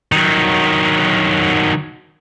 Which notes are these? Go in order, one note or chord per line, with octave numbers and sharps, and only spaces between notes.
D#3 F#3